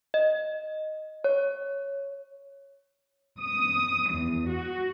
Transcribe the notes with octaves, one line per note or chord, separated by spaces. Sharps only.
D#5
C#5
D#6
E2
F#4